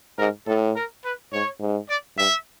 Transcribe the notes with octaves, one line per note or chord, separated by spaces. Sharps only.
G#2 A#4
A2 A4
A#4
B4
G#2 C#5
G#2
D5
G2 E5